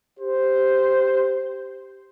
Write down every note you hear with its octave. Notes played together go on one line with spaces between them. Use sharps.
G4 C5